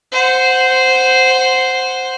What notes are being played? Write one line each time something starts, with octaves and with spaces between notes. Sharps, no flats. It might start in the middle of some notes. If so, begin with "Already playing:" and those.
C5 F#5